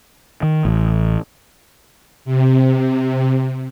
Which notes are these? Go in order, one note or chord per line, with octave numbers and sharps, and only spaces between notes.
D#3
A1
C3